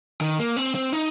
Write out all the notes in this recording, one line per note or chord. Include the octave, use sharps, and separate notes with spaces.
D#3
A#3
C4
C4
D#4